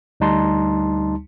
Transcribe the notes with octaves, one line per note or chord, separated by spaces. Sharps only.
D2 G3 D#4 A5 C6